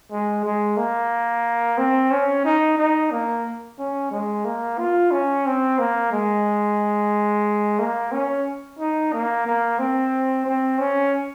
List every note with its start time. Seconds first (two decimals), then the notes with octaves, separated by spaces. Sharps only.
0.11 G#3
0.44 G#3
0.77 A#3
1.78 C4
2.11 C#4
2.45 D#4
2.78 D#4
3.11 A#3
3.78 C#4
4.11 G#3
4.45 A#3
4.78 F4
5.11 C#4
5.46 C4
5.79 A#3
6.12 G#3
7.79 A#3
8.12 C#4
8.79 D#4
9.13 A#3
9.47 A#3
9.79 C4
10.46 C4
10.79 C#4